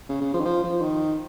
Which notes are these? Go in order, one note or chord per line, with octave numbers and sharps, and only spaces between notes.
C#3
C#3
F3
D#3
F3
F3
D#3